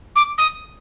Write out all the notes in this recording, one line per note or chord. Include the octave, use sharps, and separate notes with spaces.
D6
D#6